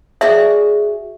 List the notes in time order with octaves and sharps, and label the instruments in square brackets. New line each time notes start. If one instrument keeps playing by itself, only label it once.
[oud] F#4 G#4 D5 [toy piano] E5